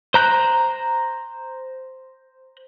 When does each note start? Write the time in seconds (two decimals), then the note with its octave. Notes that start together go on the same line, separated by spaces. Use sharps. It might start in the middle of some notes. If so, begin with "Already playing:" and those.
0.14 C5 A#5 F#6 G6